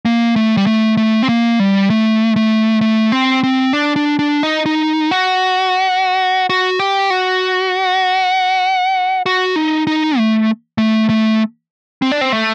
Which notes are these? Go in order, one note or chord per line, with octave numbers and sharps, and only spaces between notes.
A#3
A3
G3
A3
A3
C4
A#3
G3
A3
A3
A3
C4
C4
D4
D4
D4
D#4
D#4
F#4
F#4
G4
F#4
F#4
D#4
D#4
A3
A3
A3
C4
D4
C4
A3